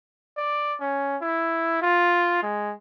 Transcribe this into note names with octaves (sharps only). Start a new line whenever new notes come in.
D5
C#4
E4
F4
G#3